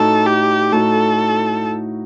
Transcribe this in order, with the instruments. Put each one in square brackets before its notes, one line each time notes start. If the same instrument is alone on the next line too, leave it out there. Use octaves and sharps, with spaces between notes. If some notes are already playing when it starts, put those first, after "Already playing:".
Already playing: [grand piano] A2 A3 D#4 F#4 [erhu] A4
[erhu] G4
[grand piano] A2 A3 D#4 F#4 [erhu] A4